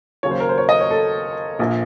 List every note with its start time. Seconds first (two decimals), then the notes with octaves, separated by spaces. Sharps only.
0.23 D#2 C#3 F#3 C#5
0.31 C5
0.40 A#4
0.49 C5
0.58 C#5
0.69 D#5
0.80 C#5
0.91 A4
1.59 A#1 A#2 F3